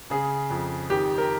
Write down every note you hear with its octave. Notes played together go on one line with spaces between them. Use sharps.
C#3 G#4
F2
D#3 G4
A#4